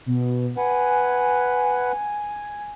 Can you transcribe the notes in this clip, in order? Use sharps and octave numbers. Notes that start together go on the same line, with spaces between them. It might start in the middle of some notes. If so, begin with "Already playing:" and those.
B2
B4 F#5 G#5